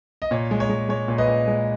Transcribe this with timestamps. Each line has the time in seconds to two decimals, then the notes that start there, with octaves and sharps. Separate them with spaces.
0.22 D#5
0.31 A#2 C#5
0.51 G#3
0.60 C#5
0.69 G#3
0.89 G#3 C#5
1.08 A#2
1.18 B4 D#5
1.28 A#2
1.48 G#3